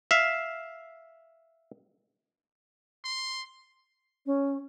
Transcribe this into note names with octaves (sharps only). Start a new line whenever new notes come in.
E5 F5
C6
C#4